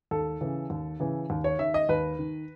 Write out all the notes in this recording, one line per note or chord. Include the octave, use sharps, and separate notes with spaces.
D#2 A4
C#3 E3
D#2
C#3 E3
D#2
C#5
D#3 E5
D#5
D#2 B4
D#3